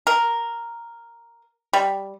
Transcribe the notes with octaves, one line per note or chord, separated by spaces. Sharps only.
A#4
G3